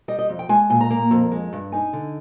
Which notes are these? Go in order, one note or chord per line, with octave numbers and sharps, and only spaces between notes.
G3 D#5
D#5
F2
G5
G#3 G#5
A#2 G#5
A#5
A#3
F2
G#3
G2
D#4 G#5
D3